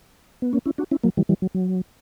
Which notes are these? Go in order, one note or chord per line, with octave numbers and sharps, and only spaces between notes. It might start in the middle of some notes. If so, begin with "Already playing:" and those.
B3
A#3 C#4
C#4 E4
D4 F#4
C#4 E4
F#3 A#3
E3 G3
E3 G3
F#3
F#3